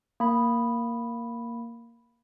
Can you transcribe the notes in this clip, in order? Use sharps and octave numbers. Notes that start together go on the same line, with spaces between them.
A#3 B5